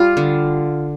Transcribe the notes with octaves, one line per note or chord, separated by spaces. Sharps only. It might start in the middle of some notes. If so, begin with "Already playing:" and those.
Already playing: G3 F4
D3